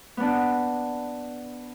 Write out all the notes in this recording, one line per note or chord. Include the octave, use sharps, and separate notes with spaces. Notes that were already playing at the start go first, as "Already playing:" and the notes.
B3 D4